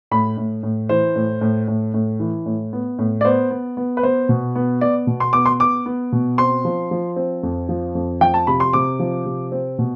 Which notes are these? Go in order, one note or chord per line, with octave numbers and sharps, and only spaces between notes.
A2 B5
A2
A2
E3 C5
A2
A2
A2
A2
E3
A2
B3
A2
D5
B3 C5
B3
B3
B4
B3 C5
B2
B3
B3 D5
B2
C6
B3 D6
C6
B3 D6
B3
B2
C4 C6
F3
F3
C4
F2
F3
F2
F3 G5
A5
C3 B5
C6
C3 D6
F3
C3
C4
B2